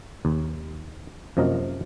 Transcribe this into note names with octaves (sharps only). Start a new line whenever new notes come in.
D#2
F#2 C3 F3 A#3 D#5 F5